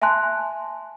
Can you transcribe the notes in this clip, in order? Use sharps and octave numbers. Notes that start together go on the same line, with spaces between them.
E5 G#5 A5 C6 F#6